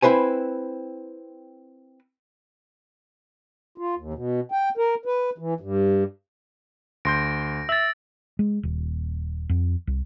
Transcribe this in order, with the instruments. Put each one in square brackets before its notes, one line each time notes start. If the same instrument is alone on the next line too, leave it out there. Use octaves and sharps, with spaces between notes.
[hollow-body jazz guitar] C4 E4 B4 C5 G#5
[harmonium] F4
D#2
B2
G5
A#4
B4
E3
G2
[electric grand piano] D2 C6 G6 [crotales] A#6 D7
[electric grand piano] E5 [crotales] E6 A6
[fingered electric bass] G#3
D#1
F2
C2